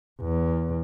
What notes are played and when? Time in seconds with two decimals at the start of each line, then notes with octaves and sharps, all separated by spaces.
0.21 E2